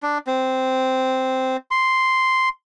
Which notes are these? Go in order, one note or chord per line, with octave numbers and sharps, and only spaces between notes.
D4
C4
C6